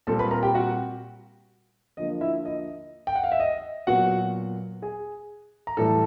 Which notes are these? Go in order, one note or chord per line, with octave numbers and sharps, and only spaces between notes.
A#2 G3 C4 A4 A5
B4 B5
A#4 A#5
G4 G5
F#4 F#5
D3 F3 A#3 D#5
E4 E5
D#5
G5
F#5
F5
E5
D#5
A#2 F#3 B3 F#4 F#5
G#4 G#5
A#5
A2 E3 G3 A4 A5